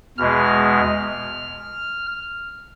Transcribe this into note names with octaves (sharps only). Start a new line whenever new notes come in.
E2 B2 G#3 F6